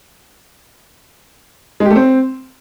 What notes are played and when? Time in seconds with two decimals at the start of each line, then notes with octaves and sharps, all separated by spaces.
1.80 G#3
1.85 G4
1.91 A3
1.96 C4